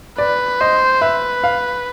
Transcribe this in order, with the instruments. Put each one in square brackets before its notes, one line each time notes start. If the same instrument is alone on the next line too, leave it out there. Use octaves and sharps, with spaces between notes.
[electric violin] B4 [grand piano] D5
[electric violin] C5 [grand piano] D#5
[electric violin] B4 [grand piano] E5
[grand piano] F5